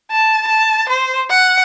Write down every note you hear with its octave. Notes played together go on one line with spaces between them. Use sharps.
A5
A5
C5
F#5